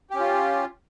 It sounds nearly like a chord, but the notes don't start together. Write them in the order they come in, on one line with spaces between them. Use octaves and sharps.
G4 C#4 F4